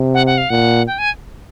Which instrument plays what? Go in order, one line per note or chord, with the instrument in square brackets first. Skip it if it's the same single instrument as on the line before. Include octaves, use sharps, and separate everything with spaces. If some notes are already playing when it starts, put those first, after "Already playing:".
Already playing: [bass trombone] C3
[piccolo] F#5
F#5
F5
[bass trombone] A#2 [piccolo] F#5
[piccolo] G5
G#5